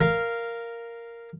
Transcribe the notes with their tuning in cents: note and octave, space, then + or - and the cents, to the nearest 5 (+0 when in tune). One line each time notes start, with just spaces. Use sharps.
A#4 +0 F5 -10